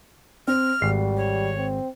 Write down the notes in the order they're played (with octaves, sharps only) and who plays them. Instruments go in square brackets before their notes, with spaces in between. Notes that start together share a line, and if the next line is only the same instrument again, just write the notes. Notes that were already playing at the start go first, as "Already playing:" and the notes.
[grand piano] C4 [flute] F6
[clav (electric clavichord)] G#1 [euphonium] G3 [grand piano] C7
[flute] C#5
[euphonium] C4